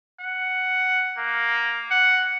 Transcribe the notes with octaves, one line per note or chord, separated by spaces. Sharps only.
F#5
A#3
F#5